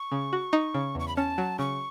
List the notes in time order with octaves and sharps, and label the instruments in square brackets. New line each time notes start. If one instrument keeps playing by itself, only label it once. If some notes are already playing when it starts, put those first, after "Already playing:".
Already playing: [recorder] C#6
[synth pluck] C#3
F#4
D#4
C#3
[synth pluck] E2 [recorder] C#6
[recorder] B5
[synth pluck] C#4 [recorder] A5
[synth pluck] F#3
[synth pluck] C#3 [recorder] C#6